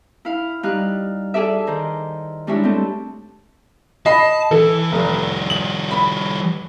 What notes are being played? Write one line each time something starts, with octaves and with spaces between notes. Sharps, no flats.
E4 F5
G3 D#4 F5 F#6
G#4 A4 D5 E5
D#3 A#4 C5
G3 G#3 D4 E4 C#5 E5
A3 C4
D#5 A5 B5 C7
E3 A4
F1 F3 G3
F#7
B5